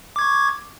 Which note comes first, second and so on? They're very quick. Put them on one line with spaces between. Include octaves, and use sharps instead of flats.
D6 G#6 C#6